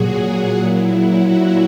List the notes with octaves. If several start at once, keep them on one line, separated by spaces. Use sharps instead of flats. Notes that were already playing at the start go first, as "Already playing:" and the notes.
Already playing: A#2 F#3 F#4 G#4
F#4
A#2 F#3 E4
F#4